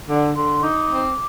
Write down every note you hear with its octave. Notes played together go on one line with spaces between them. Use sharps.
D3
D3 C6
D#4 D6
C4